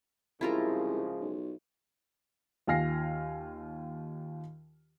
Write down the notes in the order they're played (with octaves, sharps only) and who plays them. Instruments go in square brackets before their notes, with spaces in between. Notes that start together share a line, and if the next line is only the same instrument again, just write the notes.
[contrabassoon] C2 [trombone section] C#3 F3 G#3 [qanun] E4 F4 A#4
[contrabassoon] B1
[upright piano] D#2 F4 G#5 F6 A#6 C7